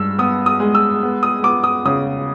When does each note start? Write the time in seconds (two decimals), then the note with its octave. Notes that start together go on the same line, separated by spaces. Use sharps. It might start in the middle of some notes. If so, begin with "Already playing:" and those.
Already playing: G2 G#3 E6
0.19 B3 D#6
0.46 D#6
0.60 G#3
0.75 E6
1.03 B3
1.23 D#6
1.43 B3 D6
1.64 D#6
1.85 C#3 D#6